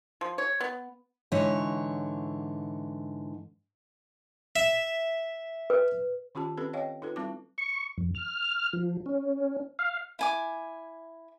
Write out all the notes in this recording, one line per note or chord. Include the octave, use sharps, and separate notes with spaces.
F3
C#5
B3
G#2 D3 E3 C#5
E5
B4
D#3 C#4 F4 G4 A5
C4 C#4 G4 A4 B4
C#5 D#5 F5 G5
D#4 F4 A4 B4
G3 C4 E4 D6
C#6
F2
F6
F3
C#4
F5
E4 G#5 D6